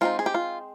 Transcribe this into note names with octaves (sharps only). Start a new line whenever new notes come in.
G#3 C4 D#4 F4
G#4
G4
F4